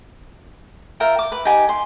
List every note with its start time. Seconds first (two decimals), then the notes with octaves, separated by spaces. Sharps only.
1.00 F4 A#4 E5 G5
1.18 D6
1.32 B4
1.45 D#4 G4 G#5
1.69 C6